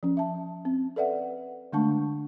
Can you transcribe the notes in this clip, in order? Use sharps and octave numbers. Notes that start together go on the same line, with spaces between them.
F3 C#4
E5 A5
C4
A4 B4 D5 E5 F#5
D3 G#3 A3 D4 A5 C#6